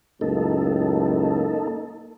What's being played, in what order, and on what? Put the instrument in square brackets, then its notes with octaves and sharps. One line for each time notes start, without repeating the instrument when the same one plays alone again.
[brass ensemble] C#2 F#2 A2 [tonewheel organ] A#3 D#4 A4